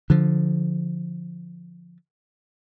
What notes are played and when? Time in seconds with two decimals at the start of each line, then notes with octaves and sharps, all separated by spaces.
0.10 D3 F3